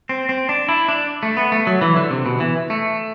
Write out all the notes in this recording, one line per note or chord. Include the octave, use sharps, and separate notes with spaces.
C4
C4
D4
E4
D4
A3
B3
A3
F#3
E3
D3
C3
B2
E3
A3